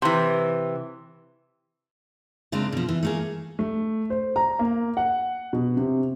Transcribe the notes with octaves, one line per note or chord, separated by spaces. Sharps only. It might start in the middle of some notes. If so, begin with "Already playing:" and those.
C3 E3
C#3 G#3 A#3 C4 D4
B2 F3
E3
A3 A#3 G#4
A3
C5
A#5
A#3
F#5
B2
C3